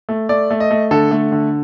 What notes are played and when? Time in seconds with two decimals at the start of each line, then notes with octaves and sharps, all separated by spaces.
0.09 A3
0.29 A3 D5
0.51 A3
0.60 D#5
0.71 A3
0.91 D3 A4
1.11 A3
1.32 D3